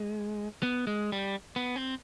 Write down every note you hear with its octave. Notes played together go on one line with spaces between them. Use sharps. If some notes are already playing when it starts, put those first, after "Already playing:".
Already playing: G#3
B3
G#3
G3
B3
C4